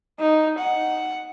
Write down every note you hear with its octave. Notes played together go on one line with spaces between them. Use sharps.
D#4
F#5